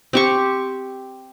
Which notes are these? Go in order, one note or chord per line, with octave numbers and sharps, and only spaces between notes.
C4 G4 C#6